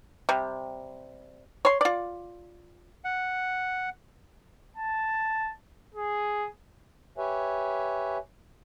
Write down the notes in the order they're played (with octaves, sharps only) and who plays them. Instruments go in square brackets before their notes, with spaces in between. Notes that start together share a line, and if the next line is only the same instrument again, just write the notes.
[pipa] C3 G3
C#5 C6
F4 D5
[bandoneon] F#5
[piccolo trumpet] A5
G#4
[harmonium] G4 B4 C#5 E5 G#5